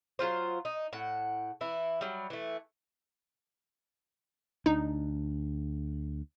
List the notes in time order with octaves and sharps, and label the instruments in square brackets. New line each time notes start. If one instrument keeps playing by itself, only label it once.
[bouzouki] F#3 E4 F4 C5
D#4
A2 F#5
E3 E4
F#3 G3
E3 A3
[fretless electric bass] D2 D4 [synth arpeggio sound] D#4